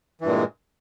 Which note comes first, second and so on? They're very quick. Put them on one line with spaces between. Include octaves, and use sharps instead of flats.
E3 G2 A#2 G#3